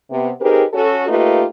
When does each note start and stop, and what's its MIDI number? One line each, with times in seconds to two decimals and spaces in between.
0.10 0.29 48
0.10 0.29 59
0.40 0.63 60
0.40 0.63 63
0.40 0.63 67
0.40 0.63 68
0.40 0.63 70
0.40 0.63 71
0.73 1.03 61
0.73 1.03 66
0.73 1.03 69
1.08 1.44 57
1.08 1.44 58
1.08 1.44 63
1.08 1.44 65
1.08 1.44 67
1.08 1.44 71